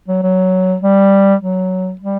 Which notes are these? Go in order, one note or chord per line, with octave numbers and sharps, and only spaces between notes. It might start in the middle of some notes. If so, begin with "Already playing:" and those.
F#3
F#3
G3
F#3
G3